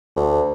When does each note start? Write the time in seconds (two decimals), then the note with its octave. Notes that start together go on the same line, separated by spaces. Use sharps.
0.16 D2